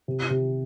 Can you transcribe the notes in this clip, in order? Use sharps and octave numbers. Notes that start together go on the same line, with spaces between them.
C3
C3